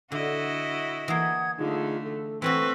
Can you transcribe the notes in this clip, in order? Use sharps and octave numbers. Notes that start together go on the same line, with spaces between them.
D3 E4 F#4 D#5
E3 A#3 F#5 D#6 G#6
D3 A3 D#4 F4 G#4
A4
E3 A3 C4 F#4 B4 C#6 E6